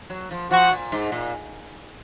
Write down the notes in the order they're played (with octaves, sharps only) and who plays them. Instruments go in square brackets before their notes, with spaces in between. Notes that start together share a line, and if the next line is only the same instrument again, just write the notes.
[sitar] F#3
F3
[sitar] F3 [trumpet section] F#4
[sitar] A#2
G#2
A#2